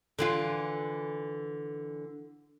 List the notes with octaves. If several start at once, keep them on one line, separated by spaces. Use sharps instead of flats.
D3 E3 F4